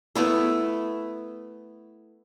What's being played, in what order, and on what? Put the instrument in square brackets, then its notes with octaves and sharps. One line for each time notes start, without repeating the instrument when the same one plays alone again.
[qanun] A3 B3 E4 A4